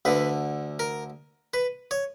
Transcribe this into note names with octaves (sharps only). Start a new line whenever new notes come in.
D2 D3 B4
A#4
B4
C#5